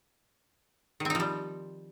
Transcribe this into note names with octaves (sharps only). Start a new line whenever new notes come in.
D#3 F3 G3 C4 D#4